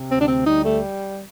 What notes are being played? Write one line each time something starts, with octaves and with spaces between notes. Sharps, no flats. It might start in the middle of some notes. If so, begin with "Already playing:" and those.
Already playing: C3
D2 C4
D4
C4
G3 D#4
A3